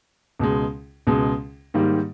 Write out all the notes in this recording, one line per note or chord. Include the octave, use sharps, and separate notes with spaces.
C#2 B2 G#3
C#2 B2 G#3
G#2 D#3 G3 A#3